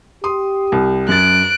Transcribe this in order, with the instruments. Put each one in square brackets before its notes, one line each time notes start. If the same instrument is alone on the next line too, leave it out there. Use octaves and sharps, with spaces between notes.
[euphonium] G4 [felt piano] C6 D#6
[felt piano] C2
[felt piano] F#2 A6 [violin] F#6 D7